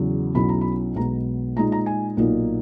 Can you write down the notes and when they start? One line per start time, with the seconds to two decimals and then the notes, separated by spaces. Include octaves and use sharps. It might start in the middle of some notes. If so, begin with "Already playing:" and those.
Already playing: E2 C#3 F#3
0.35 B1 B2 F#3 C#4 E4 B5
0.49 A#5
0.61 B5
0.95 B1 B2 G#3 B3 A#5
1.56 A#2 G#3 D#4 A#5
1.72 A#5
1.86 G#5
2.17 B1 A#2 A#3 D#4